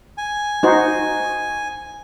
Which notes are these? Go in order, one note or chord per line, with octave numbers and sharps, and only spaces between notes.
G#5
D#4 F#4 C5